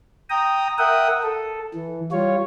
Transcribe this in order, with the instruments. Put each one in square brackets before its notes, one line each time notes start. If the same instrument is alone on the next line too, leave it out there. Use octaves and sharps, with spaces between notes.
[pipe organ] G5 A#5 D#6
A#4 E5 F#5 G5 D#6
A4
E3
G3 F4 C#5